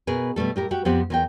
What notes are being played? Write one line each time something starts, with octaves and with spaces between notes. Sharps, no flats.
B2 G#4 A#4 B4
B2 G3 A3 A4
A2 G4 A#4
F#4 G4 F#5 G5
F2 B3 C4 G4 C5 F#5
E2 A#4 G5